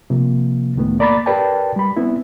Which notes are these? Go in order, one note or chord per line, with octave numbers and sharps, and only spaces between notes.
C3 F3 A#3
C#2 A2 D#3 A3 B3
A#3 D5 A#5 B5 D6 A6
G4 A#4 B4 D5 G5 A5
G3 B5
B3 C4 E4